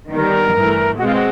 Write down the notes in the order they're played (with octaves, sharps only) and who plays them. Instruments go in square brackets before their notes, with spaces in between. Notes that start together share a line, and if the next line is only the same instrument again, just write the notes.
[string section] D#3 G3 B3 [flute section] A#4
[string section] G2 E3 A3
[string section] B2 G#3 C4 [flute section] F#4
[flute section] F4
F#4